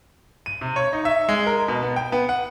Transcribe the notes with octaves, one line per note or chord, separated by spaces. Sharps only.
D#7
C3
C#5
D#4
E5
G#3
A#4
B2
B3
G5
B3
F#5